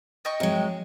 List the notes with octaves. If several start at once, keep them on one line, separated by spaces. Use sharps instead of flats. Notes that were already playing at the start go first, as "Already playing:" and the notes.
D#5 G5 C#6
F3 F#3 G#3 C4 C#5